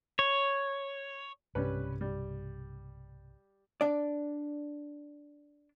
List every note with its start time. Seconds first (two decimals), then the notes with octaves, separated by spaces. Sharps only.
0.19 C#5
1.55 B1 G2 C3 G3 C#4 B4
2.01 G3
3.81 D4 D5